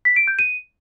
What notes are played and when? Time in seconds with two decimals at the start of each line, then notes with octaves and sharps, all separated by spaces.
0.05 B6
0.16 D7
0.27 G6
0.39 D#7